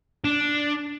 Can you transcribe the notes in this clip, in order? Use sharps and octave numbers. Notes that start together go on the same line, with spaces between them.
D4